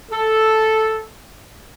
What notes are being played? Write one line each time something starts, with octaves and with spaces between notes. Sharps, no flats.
A4